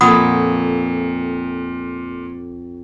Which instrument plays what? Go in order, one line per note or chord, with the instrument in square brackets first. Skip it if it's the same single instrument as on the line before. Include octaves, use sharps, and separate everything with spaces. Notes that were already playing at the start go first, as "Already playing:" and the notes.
[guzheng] F2 A4 [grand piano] A#2 [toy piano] F#5 B5 D#6